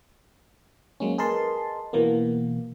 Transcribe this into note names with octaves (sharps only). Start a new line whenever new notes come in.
F#3 G#3 A#3 C#4
G#4 A#4 B4 D#5 A5 C6
B2 E3 A#3 B3